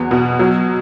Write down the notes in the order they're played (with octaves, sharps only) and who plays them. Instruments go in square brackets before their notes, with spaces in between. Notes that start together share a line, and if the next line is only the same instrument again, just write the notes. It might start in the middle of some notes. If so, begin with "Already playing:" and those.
Already playing: [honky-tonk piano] E2 F#3 B3
B2
F#3